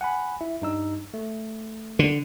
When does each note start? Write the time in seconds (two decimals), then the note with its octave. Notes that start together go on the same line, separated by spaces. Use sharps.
0.01 F#5 G#5 B5
0.41 E4 E5
0.62 G2 D#4 E6
1.14 A3
1.99 D3